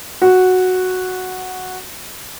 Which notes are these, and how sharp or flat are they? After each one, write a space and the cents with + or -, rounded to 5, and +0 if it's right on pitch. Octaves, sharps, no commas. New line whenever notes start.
F#4 -5